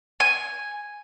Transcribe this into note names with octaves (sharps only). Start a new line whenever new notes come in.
G#5